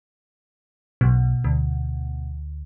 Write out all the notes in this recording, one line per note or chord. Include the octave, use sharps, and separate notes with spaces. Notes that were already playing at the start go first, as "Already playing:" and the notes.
B1 B2
D2